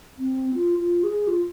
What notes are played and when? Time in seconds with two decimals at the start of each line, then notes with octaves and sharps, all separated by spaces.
0.18 C4
0.55 F4
0.79 F4
1.04 G#4
1.27 F4